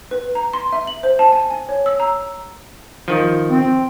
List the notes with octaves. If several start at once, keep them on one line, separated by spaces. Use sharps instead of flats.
B4
A#5
C6
E5
F#7
C5
A5
G#5
G#5
C#5
E6
A#5
D#3 F3
C4